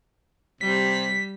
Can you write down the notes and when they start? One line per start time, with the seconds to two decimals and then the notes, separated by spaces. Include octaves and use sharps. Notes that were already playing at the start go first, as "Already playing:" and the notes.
0.61 C3 G3 B6